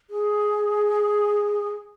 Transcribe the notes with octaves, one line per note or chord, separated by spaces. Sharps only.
G#4